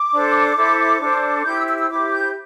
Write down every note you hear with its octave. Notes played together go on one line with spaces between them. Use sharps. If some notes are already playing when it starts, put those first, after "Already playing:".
Already playing: D6
D4 A4 C5
E4 A4 C5
D4 A4 C5
E4 G4 C5 G6
E6
E6
E6
E4 G4 C5 D6
G6